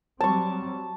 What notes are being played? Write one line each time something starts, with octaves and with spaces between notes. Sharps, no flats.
F#3 G3 C4 A5 C#6